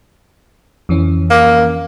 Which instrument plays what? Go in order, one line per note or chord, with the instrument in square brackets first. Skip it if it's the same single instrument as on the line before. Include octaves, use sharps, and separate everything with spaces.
[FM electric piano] F2 E3 C#4
[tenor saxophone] A#3